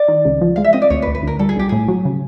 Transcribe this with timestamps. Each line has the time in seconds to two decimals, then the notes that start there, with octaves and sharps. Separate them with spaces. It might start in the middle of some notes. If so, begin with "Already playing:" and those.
Already playing: D5
0.08 D#3
0.25 C#2
0.41 F3
0.56 G#3 F5
0.64 E5
0.73 C4 D#5
0.82 D5
0.90 D2 C#5
1.02 B4
1.07 D2
1.15 B4
1.23 D2 A#4
1.39 G3 A4
1.49 G#4
1.55 B1 G4
1.69 A2 G#4
1.88 F#3
2.05 C#3